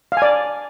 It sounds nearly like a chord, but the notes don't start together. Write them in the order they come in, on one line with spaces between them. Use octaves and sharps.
F5 G#5 D5